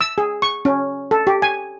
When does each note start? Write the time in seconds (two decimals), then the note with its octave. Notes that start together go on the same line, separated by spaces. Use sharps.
0.01 E6
0.18 G#4
0.42 C#6
0.65 C#4
1.11 A4
1.27 G4
1.42 G#5